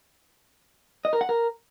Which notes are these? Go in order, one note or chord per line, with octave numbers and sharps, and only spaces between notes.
D#5
A#4
F#5
A#4